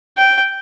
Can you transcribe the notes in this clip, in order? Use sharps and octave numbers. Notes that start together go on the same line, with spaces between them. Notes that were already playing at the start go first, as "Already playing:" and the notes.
G5